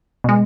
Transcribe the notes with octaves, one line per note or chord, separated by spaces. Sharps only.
B2 G#3